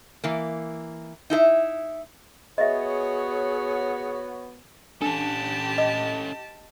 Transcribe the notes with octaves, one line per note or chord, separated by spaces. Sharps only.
E3 A#3
D#4 E4 A4 E5
B3 F#4 G#4 C#5 D#5 E5
C#4 D4 G4 A4 A5
D#5